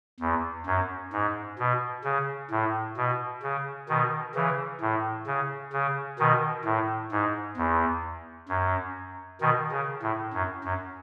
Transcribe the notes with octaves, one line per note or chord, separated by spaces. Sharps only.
E2
F#2
G#2
B2
C#3
A2
B2
C#3
B2 D#3
C#3 E3
A2
C#3
C#3
B2 D#3
A2
G#2
E2
F#2
B2 D#3
C#3
A2
F#2
F#2